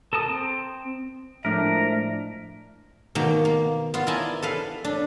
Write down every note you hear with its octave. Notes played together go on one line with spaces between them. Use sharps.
A4 A#4 A5 D#6
C4
A2 F3 G#3 A3 D4 A#4 E5
B2 D#3 A#3
A#3
B3 F4
E4 A#4 D5 D#5 G#5 A5
A4 B4 F5
D4